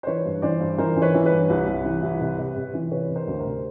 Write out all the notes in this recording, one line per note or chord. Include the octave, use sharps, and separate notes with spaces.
C5
E3 B4 C#5
G2
E3 C5 D5
G2
E3 A#4 C5
E3
B4 C#5
E3
B4 C#5
G2
C2
C2
E3
C2
C3
C3
C3
E3
C3 B4 C#5
C3
A#4 C5
D2
A#4 C5
C3